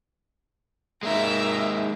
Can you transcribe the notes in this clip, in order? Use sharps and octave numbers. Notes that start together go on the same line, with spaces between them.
G#3 A#3 D#4 A#4 E5